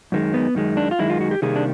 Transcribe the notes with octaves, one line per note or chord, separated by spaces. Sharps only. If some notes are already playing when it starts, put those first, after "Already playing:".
F#2 D#3 G#3
B3
F#2 D#3 G#3
D4
F4
F#2 D#3 G#3 E4
F4
F#4
G4
C3 D#3 G3 A#3 G#4
D4